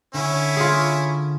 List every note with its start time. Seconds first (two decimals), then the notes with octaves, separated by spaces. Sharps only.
0.14 D3 C#4 E4
0.56 F4 G#4